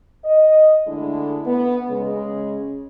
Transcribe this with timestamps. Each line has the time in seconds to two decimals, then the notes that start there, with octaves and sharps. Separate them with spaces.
0.24 D#5
0.87 D3 G#3 A3 D4 E4
1.46 B3
1.89 C#3 G#3